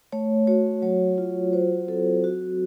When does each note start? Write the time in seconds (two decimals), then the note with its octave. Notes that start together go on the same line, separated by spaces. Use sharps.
0.12 A3 C#5
0.47 F#4 C#5
0.82 F#3 C#5
1.18 F4
1.53 F#4 C5
1.88 C4 A4
2.24 F#3 F#4